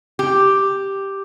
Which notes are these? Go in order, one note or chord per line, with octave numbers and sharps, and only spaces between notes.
G4